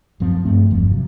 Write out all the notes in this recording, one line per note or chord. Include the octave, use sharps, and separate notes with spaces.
D1 F#2 F3 C4
G2 A3 C4
F#1 E2 G2 F3
C3 F#3